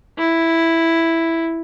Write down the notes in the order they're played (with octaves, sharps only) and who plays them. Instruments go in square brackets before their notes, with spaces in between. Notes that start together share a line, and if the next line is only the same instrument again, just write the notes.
[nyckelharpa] E4